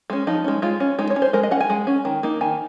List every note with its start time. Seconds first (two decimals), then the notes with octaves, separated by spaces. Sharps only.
0.10 G#3 C#4
0.27 F3 D#4
0.44 G#3 C#4
0.62 G#3 F4
0.80 C#4
0.99 G#3 D#4
1.10 C#5
1.16 C#4
1.22 C5
1.33 G#3 A#4
1.43 D#5
1.51 C#4 F#5
1.61 G#5
1.70 G#3
1.87 C#4
2.05 D#3
2.23 A#3 D#4
2.41 D#3 G#5